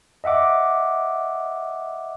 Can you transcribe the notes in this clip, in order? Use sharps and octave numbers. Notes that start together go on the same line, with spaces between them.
D#5 E5 F#5 D6